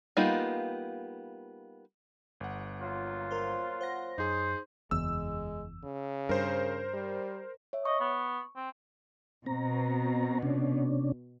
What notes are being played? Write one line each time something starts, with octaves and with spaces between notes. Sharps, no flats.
G3 A#3 B3 D#4 F4
G1 F#5
A#2 F#3 F4
A#4 C5
C5 F#5 A#6
F#2 D#4 G#4 C5
F#1 E2 G#3 E6
C#3
G2 A#4 C5
G3
C#5 E5
D#5 C#6
B3
C4
B2 C4 A#5
C3 C#4 D4